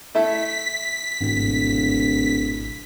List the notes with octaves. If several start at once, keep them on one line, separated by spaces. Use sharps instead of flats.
A3 E4 B6
D1 G#1 B2